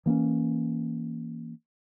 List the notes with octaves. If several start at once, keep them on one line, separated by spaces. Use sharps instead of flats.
E3 A#3 C4 C#4